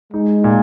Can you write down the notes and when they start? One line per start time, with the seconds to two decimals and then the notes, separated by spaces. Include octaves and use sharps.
0.13 G#3 D#4
0.44 A#2